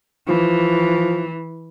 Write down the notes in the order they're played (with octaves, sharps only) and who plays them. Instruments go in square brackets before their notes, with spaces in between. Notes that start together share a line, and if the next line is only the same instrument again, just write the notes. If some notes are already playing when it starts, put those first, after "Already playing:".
[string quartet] E3 [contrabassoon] F3